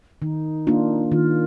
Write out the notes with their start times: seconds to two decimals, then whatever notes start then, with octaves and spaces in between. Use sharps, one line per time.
0.22 D#3 D#4
0.67 A#3 D4 F4
1.12 D#3 F4